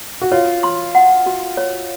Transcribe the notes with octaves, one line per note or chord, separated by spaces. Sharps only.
F#4
F4 C#5
C6
F#5
F#4
C#5